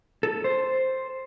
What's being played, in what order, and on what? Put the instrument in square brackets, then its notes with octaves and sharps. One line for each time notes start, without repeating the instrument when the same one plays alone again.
[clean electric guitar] A4
C5